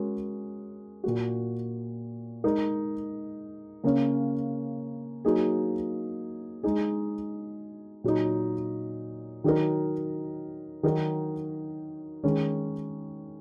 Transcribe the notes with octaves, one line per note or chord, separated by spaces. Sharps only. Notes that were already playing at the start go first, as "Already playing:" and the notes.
Already playing: G#3 C#4 F#4 A#4
A#2 A#3 F#4
G#3 D#4 A#4
C#3 A#3 C#4
F#3 A#3 D#4 G#4
G#3 D#4 G#4
A#2 F#3 D#4
D#3 F#3 D#4 A#4
D#3 F#3 D#4 F#4 A#4
D#3 G#3 C#4 G#4